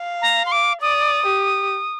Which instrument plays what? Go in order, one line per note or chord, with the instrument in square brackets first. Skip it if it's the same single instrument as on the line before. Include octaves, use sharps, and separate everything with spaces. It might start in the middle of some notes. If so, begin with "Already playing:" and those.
Already playing: [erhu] F5
[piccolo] A#5
C6
D6
[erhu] D5 [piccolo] D#6
[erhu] G4